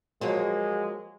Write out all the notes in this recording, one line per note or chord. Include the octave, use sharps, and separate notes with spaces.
F3 F#3 G#3 A#3